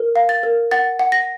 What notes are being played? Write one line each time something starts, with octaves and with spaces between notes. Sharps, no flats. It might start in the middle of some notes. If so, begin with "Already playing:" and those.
Already playing: A#4
F5
A6
A#4
F#5 A6
F#5
A#6